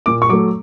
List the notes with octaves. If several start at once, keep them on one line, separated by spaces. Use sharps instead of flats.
A#2 D6
C#6
F#3 A3 D6